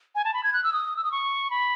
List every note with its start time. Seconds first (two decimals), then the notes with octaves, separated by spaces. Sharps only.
0.15 G#5
0.25 A5
0.34 B5
0.44 G#6
0.54 F#6
0.64 E6
0.73 D#6
0.97 E6
1.04 D#6
1.12 C#6
1.51 B5